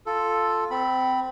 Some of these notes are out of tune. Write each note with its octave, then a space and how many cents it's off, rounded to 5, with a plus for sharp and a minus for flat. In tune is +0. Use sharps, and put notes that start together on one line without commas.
F4 +0 A4 +0
C4 -20 B5 +0